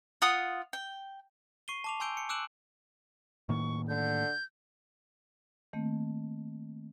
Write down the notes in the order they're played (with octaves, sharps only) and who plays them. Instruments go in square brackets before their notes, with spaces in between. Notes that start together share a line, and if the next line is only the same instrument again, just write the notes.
[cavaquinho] F4 F#5 D#6
G5
[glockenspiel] C#6 C7 D#7 G7
A5 D6 F7
G#5 C6 E6 G6 D7 G7
C#7
D6 E6 F#6 D7 E7 F#7
[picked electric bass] A2 D#3 A#3 [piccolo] C#6
[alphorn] D3 [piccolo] G6
[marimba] D#3 A3 A#3 C4